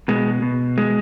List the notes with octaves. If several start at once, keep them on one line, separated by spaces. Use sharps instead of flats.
B2 G#3
B2
G#3